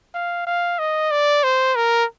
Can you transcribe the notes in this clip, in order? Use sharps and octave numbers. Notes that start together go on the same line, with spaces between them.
F5
F5
D#5
D5
C5
A#4